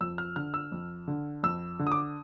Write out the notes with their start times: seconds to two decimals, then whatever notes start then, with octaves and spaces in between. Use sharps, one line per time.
0.01 F2 E6
0.18 F6
0.36 D3 F6
0.54 E6
0.72 F2
1.08 D3
1.43 F2 E6
1.79 D3
1.87 D#6
1.92 D6